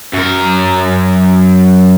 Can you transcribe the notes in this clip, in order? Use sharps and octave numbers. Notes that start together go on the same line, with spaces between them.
F#2 A#4